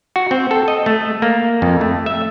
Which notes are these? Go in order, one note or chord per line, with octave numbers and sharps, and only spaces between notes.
F#4
C4
A4
D#5
A3
A#3
F2
A3
E5